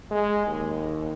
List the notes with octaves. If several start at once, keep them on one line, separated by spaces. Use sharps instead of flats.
G#3
D#2